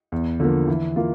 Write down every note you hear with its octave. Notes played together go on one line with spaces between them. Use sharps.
E2
D3 F3 A#3
E3
A#3 F4